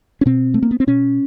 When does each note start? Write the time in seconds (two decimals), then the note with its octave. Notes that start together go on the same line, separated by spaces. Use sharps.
0.21 C#4
0.26 B2 C4
0.54 A3
0.63 A#3
0.71 B3
0.80 C4
0.87 B2 C#4